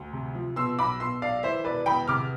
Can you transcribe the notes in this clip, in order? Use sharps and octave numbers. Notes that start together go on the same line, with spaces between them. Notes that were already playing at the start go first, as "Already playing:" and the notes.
Already playing: D2
C3
F3
B2 C6 E6
B1 B5 D6
B2 C6 E6
B1 D5 F5
E3 C5 E5
E1 B4 D5
E2 G5 B5
C3 D6 F6